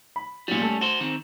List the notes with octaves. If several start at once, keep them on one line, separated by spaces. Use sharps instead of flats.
B5
A#2 F#3 G3 C#4
A3
F#4 C5 E7
D#3 C4